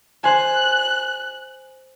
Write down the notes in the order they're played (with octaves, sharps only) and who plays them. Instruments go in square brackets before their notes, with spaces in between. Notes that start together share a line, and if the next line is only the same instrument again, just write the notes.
[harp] C5 G#5 [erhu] F#6